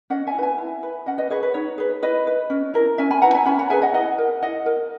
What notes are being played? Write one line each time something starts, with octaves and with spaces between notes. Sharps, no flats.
C#4 D#5 F#5
E5 G#5
E4
B4 E5 G#5
E4
B4
C#4 D#5 F#5
B4 D#5
G#4 B4 C#5
B4
D#4 C#5
G#4 B4
E4 B4 D#5
B4
C#4
E4 A#4
C#4 E5 G#5
G#5 B5
E4 B4 F#5 A#5
E5 G#5
C#4 G#5 B5
F#5 A#5
G#4 B4 E5 G#5
D#5 F#5
E4 D#5 F#5
A#4
E4 D#5 F#5
A#4